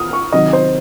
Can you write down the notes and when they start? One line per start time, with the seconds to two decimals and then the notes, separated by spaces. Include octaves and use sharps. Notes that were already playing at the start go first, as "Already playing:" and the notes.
Already playing: D#6 F6
0.13 C#6
0.32 C3 D#3 F#3 D#5
0.53 C5